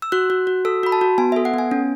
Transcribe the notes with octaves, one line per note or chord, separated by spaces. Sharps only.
E6
F#4 F#6
F#4
F#4
A4 E6
F#4 B5
A5
F#4
B3 G#5
A4 E5
F#5
B3 G#5
C#4